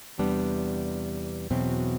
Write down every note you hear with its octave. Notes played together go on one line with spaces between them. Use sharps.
E2 C3 G3 B3 D4
E2 B2 F#3 C4 E4